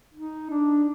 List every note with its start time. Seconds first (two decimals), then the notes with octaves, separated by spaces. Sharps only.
0.14 D#4
0.50 D4